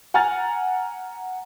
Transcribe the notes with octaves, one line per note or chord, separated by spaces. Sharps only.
F#5 G#5 A#5 F6 A6